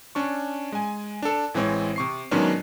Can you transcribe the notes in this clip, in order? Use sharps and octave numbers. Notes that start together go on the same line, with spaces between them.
C#4 D4 C#6
G#3 G#5
D4 A4
A1 E3 G#3 C4 C#5
C3 C#6 C7
G#2 D#3 F#3 B3 C#4 D4